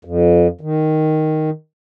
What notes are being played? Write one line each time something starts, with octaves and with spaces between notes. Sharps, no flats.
F2
D#3